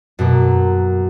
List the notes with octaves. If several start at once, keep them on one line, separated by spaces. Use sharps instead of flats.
F#2 B2 A#3